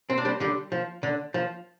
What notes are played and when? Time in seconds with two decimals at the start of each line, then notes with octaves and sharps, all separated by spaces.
0.10 C4
0.18 D4
0.25 G3 C4
0.40 D3 G3
0.72 F3
1.03 D3
1.34 F3